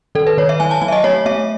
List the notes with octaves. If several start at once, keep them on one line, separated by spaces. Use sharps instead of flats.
D#3 A4
B4
D#3 C#5
E5
F#3 G#5
A5
F#3 G#5
E5
D#5
A3 C#5
A3 E5